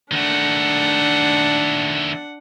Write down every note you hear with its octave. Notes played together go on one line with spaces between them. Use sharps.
D#3 A3 D4 F#5